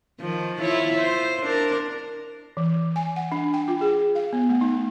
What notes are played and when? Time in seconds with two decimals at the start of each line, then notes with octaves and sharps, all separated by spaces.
0.20 D#3 F3
0.61 E4 F4 C#5
0.99 C5
1.43 D4 A#4
2.57 E3
2.96 G#5
3.16 F#5
3.32 D4
3.54 G5
3.68 F4
3.81 G#4
4.15 F5
4.33 B3
4.50 A3
4.61 D#4